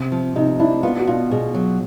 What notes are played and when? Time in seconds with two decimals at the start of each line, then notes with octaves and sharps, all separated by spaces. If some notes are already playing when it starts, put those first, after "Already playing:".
Already playing: C3
0.12 F3
0.36 C3 D#4
0.60 D4 E4
0.83 B3 F4
0.99 F#4
1.07 B2 F4
1.30 B2 G#4
1.55 F#3